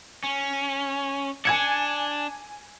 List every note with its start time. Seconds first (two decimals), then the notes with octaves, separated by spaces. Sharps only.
0.24 C#4
1.45 D4 G#5 G#6 C#7